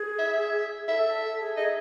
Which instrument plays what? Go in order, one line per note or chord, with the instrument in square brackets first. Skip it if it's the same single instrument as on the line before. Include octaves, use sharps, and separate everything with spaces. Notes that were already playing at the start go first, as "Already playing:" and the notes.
Already playing: [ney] G#4
[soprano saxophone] E5
[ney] A4 [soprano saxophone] E5
[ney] A4
G#4
[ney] G#4 [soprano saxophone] D#5